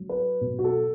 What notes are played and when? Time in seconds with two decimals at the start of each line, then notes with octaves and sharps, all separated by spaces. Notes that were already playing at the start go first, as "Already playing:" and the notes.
Already playing: F#3
0.09 B4
0.41 B2
0.59 F#4
0.64 A4